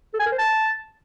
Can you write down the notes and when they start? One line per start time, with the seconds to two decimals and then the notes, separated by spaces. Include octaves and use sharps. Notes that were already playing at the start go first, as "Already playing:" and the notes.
0.14 A4
0.20 G#5
0.26 A#4
0.32 C5
0.38 A5